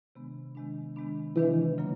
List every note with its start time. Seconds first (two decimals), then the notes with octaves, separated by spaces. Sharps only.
0.15 C3 D#3 G#3 B3 D4
0.55 C3 D#3 G#3 B3 D4
0.96 C3 D#3 G#3 B3 D4
1.36 C3 D#3 E3 G#3 B3 D4
1.78 C#3 F#3 A#3